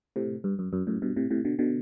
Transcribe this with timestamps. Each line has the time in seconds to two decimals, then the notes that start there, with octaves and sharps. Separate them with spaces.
0.16 A2 C3
0.44 G2
0.59 F#2
0.73 F#2
0.87 F#2 A2
1.02 G2 B2
1.16 A2 C3
1.31 A2 C3
1.45 B2 D3
1.59 B2 D3